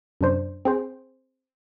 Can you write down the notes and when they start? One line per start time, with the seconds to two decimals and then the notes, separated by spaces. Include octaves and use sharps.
0.21 F#2 C3 D4 C5
0.65 C4 G#4 C5